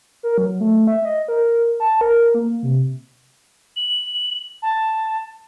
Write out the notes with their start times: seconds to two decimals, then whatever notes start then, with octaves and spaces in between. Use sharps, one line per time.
0.23 A#4
0.38 F#3
0.61 A3
0.87 E5
1.05 D#5
1.28 A#4
1.80 A5
2.01 A#4
2.34 A#3
2.63 C3
3.76 F#7
4.62 A5